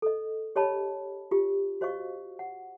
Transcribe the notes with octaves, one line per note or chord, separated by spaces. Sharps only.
A4 D#5
G4 C#5 D#5 A5 B5
F4 G4
F#4 C5 D#5 F5 C#6
F#5